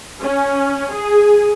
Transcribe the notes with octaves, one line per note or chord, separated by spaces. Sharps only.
C#4
G#4